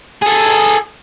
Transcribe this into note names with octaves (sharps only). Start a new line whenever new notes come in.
G#4 A4